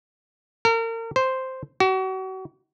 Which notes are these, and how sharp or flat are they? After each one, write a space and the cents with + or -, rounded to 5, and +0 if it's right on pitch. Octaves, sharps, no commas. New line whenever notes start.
A#4 -35
C5 +0
F#4 +35